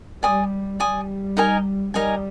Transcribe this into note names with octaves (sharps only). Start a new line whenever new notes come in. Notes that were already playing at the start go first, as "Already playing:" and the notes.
G3 D5 G#5 D#6
G3 D5 G#5 D#6
D#4 A#4 D#5 G#5
G3 D#4 A#4 D#5 G#5